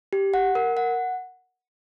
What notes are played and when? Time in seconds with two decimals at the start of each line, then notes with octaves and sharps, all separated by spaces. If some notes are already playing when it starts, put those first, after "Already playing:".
0.13 G4
0.34 F#5
0.55 A#4
0.77 F#5